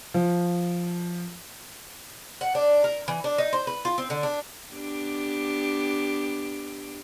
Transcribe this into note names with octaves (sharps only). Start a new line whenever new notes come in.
F3
F#5
D4
A#4
E3
D4
D#4
C5
B4
F4
C4
D3
D4
B3 D4 G4